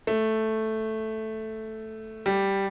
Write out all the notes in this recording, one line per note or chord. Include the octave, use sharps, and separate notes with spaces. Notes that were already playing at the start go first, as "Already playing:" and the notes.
A3
G3